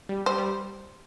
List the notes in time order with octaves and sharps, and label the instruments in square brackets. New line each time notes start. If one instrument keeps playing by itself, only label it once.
[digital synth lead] G3
[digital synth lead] G3 [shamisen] C5
[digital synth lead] G3